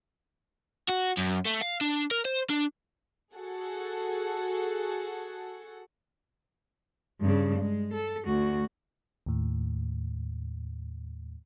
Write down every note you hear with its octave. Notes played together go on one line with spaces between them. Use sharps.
F#4
F#2
A3
F5
D4
A#4
C5
D4
F#4 G#4 A4 F#5
G2 C#3
G#3
A4
D2 F#4
D#2 A2